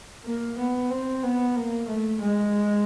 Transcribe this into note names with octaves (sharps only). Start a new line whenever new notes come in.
A#3
B3
C4
B3
A#3
A3
G#3